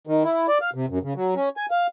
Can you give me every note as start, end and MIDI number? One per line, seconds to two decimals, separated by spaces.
0.07 0.23 51
0.24 0.47 64
0.48 0.58 74
0.61 0.70 77
0.74 0.86 48
0.89 0.99 42
1.03 1.14 49
1.15 1.34 54
1.36 1.49 61
1.57 1.66 80
1.71 1.87 77